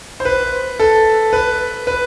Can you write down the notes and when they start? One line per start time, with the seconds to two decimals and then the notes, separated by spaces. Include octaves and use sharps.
0.20 C5
0.25 B4
0.80 A4
1.33 B4
1.87 B4